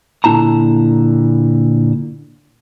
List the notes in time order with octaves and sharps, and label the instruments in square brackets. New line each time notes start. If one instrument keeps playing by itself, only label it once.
[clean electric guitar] A#2 D3 D4 E4 A5 A#5